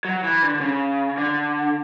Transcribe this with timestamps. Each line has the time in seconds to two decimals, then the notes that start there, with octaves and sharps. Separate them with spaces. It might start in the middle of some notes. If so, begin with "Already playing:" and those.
0.05 F#3
0.24 E3
0.42 D3
0.60 C#3
1.18 D3